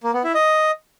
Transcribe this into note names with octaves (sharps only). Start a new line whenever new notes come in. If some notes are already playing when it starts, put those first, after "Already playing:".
A#3
B3
E4
D#5